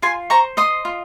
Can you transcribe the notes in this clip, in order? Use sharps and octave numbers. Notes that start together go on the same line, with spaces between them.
F4 G#5 C6
C5 A#5 C#6
D#5 C6 D#6
F4